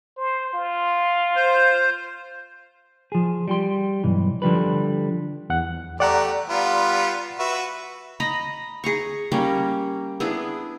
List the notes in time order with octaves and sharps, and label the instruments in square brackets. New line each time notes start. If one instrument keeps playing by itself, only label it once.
[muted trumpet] C5
F4
[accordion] C5
[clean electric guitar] F3 G#4
G3 G4 C6
B1 G2 E3
D3 F3 G3 B4
[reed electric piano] E2 F#5
[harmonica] A3 G4 [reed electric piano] D5 F#5 A#5
[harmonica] G3 B3 F4
F#4 B4 E5
[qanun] D#5 A#5 B5
G#4 A#5 C#6
G3 A#3 C#4
B3 D4 E4 G#4